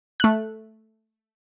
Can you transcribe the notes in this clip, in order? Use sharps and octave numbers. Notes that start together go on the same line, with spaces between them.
A3 F#6